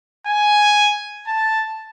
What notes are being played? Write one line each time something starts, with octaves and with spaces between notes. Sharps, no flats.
G#5
A5